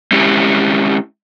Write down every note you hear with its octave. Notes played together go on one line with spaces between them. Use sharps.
G#3 C#4 E4 G4